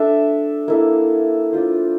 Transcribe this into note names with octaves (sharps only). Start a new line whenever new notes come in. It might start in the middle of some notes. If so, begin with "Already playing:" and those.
Already playing: D4 A4 E5
A#3 E4 A4
D4 F4 C5